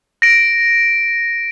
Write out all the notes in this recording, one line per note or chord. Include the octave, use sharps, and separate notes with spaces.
A#6 D7